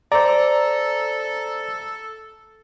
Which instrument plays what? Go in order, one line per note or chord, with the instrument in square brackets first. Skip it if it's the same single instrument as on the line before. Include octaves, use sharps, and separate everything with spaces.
[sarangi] A4 [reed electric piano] C5 D5 [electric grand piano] A#5